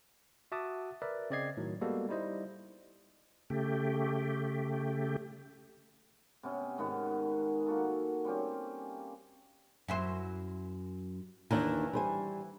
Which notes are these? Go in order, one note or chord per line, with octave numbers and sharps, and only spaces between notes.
F#4 E5 F#5 A5 D6 D#6
A#4 B4 D5 E5
C#3 C4 D5 D#5 G#6 C7
A2 D#3 F#3
G3 G#3 A#3 B3 F#4 A4
G3 D#4 E4 C5 D#5
C#3 A3 G4
C3 B3 C#4
G#2 D#3 B3 F#5
A#3 F#4 A4
G3 C4 C#4 G4
F#2 E4 C5
D#2 D#3 E3 D4
G3 C5 G#5